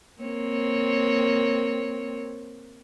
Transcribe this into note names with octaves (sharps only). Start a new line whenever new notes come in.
A#3 C4 C#5